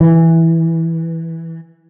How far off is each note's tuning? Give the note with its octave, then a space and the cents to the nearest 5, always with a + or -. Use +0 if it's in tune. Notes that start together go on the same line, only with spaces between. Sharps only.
E3 -5